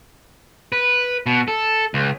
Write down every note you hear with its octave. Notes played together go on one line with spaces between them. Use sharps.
B4
B2
A4
C#2